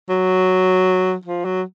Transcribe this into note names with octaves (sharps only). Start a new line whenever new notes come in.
F#3
F3
F#3